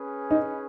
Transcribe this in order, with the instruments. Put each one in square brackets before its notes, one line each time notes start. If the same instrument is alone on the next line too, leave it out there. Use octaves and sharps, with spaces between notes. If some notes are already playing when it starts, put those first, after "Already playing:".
Already playing: [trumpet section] C#4 G#4 B4
[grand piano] D#4